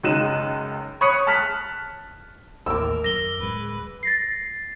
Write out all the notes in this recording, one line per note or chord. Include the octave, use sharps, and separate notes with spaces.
C#2 F#2 D#4 F#6 D#7 E7
C#5 B5 C#6 D#6 F#6 C#7
A5 F6 F#6 B6
A1 D#2 A2 A#4 D6 E6
F#2 A#6 G7
D1 G#3 B4
A6 A#6 C7